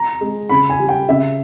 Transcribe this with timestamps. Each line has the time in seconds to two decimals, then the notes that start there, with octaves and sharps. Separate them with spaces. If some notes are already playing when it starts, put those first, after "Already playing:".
Already playing: A#5
0.21 G#3
0.49 C#3 B5
0.70 G#5
0.80 G3
0.89 G5
1.08 C#3 E5